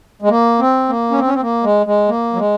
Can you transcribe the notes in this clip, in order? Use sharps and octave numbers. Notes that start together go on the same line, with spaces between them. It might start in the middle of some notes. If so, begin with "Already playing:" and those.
G#3
A#3
C4
A#3
C#4
C4
C#4
C4
A#3
G#3
G#3
A#3
F#3
G#3